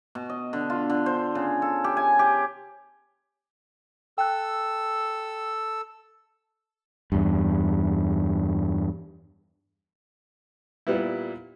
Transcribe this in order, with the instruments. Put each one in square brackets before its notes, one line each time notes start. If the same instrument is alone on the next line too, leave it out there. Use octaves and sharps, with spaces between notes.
[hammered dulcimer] B2
D#5
D3
F4
D3
C5
C#3
A4
G4
G#5
G4
[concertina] A4 E6 [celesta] G5 F#6
[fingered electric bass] E2 G2
[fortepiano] A#2 G3 B3 E4